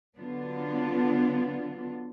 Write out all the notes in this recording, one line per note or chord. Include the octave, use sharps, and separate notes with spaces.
D3 F#3 B3 D4 F4